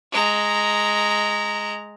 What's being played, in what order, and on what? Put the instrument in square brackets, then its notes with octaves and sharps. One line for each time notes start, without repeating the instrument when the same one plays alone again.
[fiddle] G#3 A#5